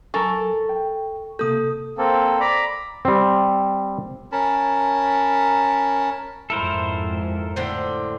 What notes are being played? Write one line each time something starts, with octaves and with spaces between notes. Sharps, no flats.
F#3 A4 A#4 G#5 C#6
G5
C3 A#3 A4 D#6 G6
A#3 C4 A4
D5 A#5 B5
G3 C4
C#4 A#4 A5 B5
F2 G#2 E4 A4 A#4 C5
A2 D3 C4